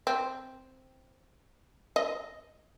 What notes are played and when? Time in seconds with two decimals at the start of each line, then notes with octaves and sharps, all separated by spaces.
0.07 C4
1.96 D#5